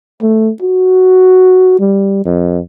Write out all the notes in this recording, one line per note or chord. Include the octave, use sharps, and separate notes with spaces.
A3
F#4
G3
F2